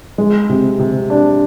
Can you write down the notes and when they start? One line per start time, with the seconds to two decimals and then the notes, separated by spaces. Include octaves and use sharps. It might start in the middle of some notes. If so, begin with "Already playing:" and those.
0.18 G#3
0.49 C3
0.79 C3
1.10 D4